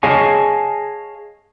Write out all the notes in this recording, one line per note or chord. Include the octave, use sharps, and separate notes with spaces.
G#4 C#5 D#5 F5 G#5 A5